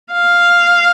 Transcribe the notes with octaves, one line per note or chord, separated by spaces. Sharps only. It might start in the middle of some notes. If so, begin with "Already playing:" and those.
F5